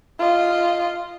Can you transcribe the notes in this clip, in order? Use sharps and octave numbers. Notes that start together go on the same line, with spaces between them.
F4 D#5